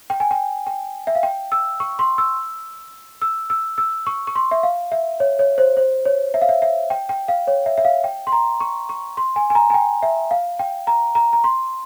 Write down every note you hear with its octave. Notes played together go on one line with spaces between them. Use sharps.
G5
G#5
G5
G5
E5
F5
G5
E6
C#6
C6
E6
E6
E6
E6
C#6
C#6
C6
E5
F5
E5
C#5
C#5
C5
C5
C#5
E5
F5
E5
E5
G5
G5
F5
C#5
E5
E5
F5
G5
C6
A#5
C#6
C#6
C6
G#5
G#5
A#5
G#5
G5
E5
F5
G5
A#5
A#5
A#5
C6